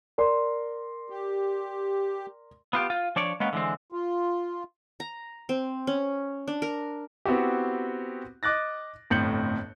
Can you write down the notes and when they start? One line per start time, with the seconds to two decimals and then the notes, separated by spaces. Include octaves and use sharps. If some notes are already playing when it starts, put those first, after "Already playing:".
0.18 A#4 D5 C6
1.10 G4
2.73 B3 F4 G4
2.90 F4
3.16 F3 D4 C#5 D5
3.40 G#3 A#3 B3 C#4
3.53 D3 E3 G#3 C4
3.92 F4
5.00 A#5
5.49 C4
5.87 C#4
6.48 D4
6.62 A#4
7.25 B3 C4 E4 F#4 G4
8.43 D#5 D6 F#6 A6 A#6
9.10 G1 F2 A2 G6 C#7 F#7